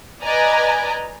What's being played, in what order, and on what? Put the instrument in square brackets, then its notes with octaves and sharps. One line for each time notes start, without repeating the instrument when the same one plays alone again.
[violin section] B4 D5 D#5 G#5 A#5